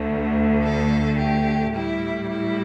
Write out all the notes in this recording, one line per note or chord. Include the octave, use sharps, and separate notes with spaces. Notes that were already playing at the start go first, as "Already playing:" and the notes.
Already playing: D2 D3 A3
A4
G4
A2 G3 E4
E4